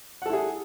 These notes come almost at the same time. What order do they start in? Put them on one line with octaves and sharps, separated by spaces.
F#5 A4 E4 G#4